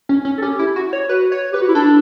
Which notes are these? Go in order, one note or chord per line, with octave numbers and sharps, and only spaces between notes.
C#4
C#4
A4
C#4 G4
E4
F#4
C#5
F#4 B4
C#5
G4 B4
F#4
E4
D4 A4